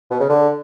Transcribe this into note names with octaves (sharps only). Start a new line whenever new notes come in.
B2
C#3
D3